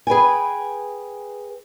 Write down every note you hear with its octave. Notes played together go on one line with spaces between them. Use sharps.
G#4 B4 G5 G#5